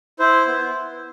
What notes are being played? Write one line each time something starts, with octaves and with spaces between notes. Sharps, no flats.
E4 C5
B3